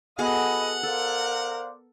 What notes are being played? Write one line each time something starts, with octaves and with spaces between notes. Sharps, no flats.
B3 F#4 G#4 A4 D#5 F#5 B5
A4 A#4 C5 D5 F5